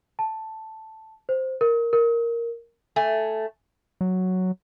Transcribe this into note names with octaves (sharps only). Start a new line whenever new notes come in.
A5
C5
A#4
A#4
A3 G#5
F#3